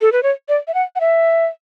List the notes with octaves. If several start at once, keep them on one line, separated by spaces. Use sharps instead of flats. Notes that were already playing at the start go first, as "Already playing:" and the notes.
A4
B4
C#5
D5
E5
F#5
F#5
E5